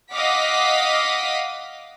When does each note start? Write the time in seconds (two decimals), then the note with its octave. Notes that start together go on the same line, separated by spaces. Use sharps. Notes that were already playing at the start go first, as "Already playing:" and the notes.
0.12 D#5 F5 F#5 D6 B6